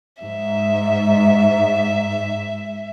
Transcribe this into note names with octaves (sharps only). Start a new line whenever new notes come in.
G#2 E5